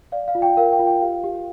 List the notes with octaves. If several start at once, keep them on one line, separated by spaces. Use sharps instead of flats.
D5 F5
F5
F4
G5
A#4 F5
G5
F4
G5
G4 F5
G4